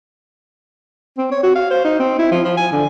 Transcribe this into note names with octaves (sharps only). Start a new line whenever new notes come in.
C4
C#5
F#4
F5
C5
D#4
C4
E4
F3
F3
G#5
D3